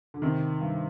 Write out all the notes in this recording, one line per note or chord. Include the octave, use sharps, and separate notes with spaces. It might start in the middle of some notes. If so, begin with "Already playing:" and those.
D3
C3 D#3
G2